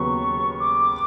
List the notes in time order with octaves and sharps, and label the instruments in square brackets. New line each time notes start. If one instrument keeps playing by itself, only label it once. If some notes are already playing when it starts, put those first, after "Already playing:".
Already playing: [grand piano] D#2 C#3 F#3 B3 [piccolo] C#6
[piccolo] D6